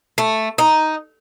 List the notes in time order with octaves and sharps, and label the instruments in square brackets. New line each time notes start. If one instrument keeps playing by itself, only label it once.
[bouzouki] A3
D#4